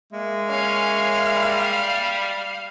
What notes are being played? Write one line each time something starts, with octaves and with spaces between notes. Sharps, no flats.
G#3 A#3 E5
C#4 F5
G3